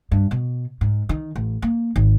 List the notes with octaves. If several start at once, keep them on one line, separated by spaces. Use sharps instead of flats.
G2
B2
G#2
D#3
A1
A#3
G#1